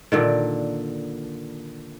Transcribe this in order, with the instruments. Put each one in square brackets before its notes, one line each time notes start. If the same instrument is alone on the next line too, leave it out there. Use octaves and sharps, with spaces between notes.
[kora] A#2 D3 D#3